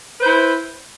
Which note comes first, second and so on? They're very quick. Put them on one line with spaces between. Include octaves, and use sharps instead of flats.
B4 C5 E4